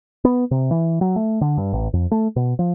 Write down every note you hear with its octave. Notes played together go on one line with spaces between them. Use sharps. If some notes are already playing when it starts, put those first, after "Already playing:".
B3
C3
E3
F#3
A3
D3
G2
A1
F2
A3
B2
F3